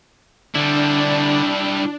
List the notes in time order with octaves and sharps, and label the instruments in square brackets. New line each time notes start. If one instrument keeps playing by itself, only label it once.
[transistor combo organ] D3 [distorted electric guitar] G3 E4 [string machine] D4